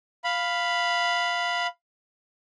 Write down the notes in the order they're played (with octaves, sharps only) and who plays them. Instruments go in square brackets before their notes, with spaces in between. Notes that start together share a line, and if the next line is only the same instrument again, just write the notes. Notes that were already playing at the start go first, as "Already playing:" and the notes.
[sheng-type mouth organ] F5 B5